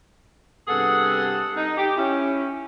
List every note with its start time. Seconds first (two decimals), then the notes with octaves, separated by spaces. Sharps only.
0.68 G2 C3 B3 G#4 A4 F#5
1.55 D#4
1.77 G4
1.97 C#4 E4